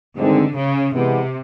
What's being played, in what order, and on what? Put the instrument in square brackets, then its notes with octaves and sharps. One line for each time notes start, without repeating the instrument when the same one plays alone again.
[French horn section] G2 D#3 G#3 C4 D#4 [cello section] D3
[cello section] C#3
[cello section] C3 [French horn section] E3 G#3 B3